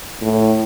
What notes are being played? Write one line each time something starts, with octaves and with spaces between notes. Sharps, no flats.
A2